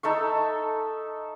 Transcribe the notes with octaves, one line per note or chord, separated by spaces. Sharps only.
D#4 A4 E5 C#6